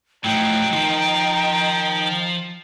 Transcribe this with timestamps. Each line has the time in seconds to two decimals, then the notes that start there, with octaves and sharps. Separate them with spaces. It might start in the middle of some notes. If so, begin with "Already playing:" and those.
0.24 A2 F3 F#3 D#4 G5
0.73 D#3 F3